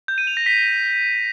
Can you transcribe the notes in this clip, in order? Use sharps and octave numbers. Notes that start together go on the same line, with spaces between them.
G6
D#7
F7
A#6
B6